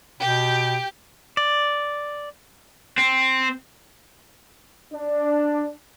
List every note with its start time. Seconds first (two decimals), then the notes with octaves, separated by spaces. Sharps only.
0.20 B2 G4 G5
1.37 D5
2.98 C4
4.94 D4